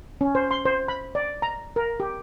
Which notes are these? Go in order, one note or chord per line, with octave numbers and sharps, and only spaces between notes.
C#4
C5
C6
C5
B5
D5
A#5
A#4
G4